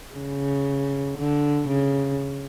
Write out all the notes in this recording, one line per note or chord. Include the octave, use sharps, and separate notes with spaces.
C#3
D3
C#3